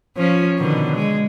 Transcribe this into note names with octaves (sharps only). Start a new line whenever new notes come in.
F3 C#4
B2 D3 D#3
G#3